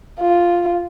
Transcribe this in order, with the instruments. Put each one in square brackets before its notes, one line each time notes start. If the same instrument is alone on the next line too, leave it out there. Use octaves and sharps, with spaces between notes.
[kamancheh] F4